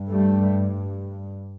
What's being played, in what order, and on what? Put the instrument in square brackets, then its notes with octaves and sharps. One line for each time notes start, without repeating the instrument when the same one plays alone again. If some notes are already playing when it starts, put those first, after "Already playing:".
Already playing: [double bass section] G2
G3 A3